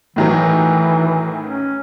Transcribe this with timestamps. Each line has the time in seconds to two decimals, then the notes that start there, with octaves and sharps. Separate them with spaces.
0.16 A2 D#3 E3 F#3
1.46 C#4